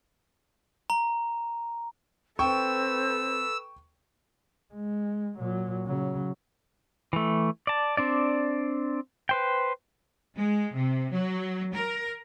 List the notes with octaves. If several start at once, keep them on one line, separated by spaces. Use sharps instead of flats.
A#5
C4 A4 B4 G5 C#6 E6
G#3
A#2 F#3
C#3 F#3
E3 A3
D5 A5
C4 D4 D5
B4 C5 G5
G#3
C3
F#3
A#4